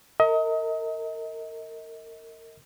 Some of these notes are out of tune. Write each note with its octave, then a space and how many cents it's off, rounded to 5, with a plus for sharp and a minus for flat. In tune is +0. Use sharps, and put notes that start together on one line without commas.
A#4 -30 D#5 +35